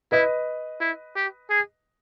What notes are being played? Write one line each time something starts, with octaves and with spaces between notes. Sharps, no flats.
E4 B4 D#5
E4
G4
G#4